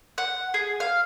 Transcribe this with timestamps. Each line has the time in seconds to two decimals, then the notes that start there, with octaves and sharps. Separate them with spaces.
0.18 F#5
0.54 G#4
0.80 F5